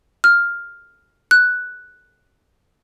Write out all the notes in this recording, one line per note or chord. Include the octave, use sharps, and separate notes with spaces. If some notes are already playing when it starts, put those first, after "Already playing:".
F6
F#6